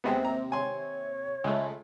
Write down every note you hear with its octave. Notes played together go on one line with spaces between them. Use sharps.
D#2 C3 G#3 B3 C4
A#5
C#5 G#5 C6
C#2 G#3 A3